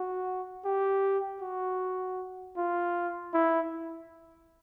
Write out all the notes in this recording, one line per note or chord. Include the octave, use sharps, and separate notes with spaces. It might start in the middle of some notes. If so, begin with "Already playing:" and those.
Already playing: F#4
G4
F#4
F4
E4